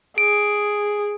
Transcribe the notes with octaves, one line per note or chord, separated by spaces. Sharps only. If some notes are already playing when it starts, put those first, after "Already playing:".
G#4 D7